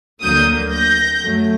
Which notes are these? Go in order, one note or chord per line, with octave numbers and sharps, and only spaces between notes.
D2 D3 F#3 A#3 D#6 G6
G6 A#6
F#2 F#3 A3